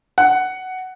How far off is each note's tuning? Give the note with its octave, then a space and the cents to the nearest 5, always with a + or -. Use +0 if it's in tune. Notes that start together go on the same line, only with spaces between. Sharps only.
F#5 +10